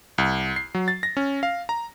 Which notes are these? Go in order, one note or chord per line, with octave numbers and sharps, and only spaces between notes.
C2
C7
F#3
A6
A#6
C#4
F5
A#5